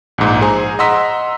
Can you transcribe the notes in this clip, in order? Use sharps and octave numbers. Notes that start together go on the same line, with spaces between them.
A#1 G#2
G#4 C5 G#5 A#5
D#5 F#5 A#5 C6 E6 B6